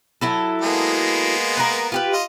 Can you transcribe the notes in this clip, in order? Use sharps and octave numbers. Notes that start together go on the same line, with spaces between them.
F#3 E4 A4
G#3 A#3 B3
A#4 B4
F4 G4 B4
F4 D#5